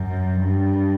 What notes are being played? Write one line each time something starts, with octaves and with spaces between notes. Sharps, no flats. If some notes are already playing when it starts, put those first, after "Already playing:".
Already playing: F#2
G2